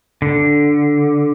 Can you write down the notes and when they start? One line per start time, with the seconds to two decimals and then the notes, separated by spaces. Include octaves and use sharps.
0.22 D3